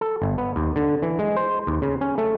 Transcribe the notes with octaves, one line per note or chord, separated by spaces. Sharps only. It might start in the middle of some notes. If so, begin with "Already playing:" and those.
A4
G1
B3
D#2
D3
E3
G#3
C5
D#2
C#3
C#4
A3